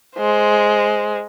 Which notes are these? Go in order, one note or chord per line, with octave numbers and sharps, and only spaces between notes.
G#3 C5